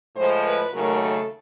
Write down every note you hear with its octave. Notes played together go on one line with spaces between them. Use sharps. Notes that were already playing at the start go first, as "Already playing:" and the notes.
A2 F3 G#3 C5
B4
D#2 C#3 F#3 A3 A#4
A4